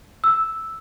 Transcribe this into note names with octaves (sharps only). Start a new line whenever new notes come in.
E6